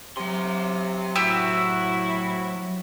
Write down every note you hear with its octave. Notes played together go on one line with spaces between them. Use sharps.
C3 F#3 C6
A2 C3 E4 F#4 G4 E5 E6